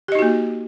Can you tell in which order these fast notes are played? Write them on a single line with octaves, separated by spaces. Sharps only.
G4 D#5 D#4 F#4 A#3